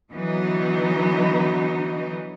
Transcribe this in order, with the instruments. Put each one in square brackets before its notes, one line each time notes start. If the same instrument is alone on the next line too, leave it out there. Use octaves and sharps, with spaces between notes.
[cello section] D3 E3 F#3 B3 D#4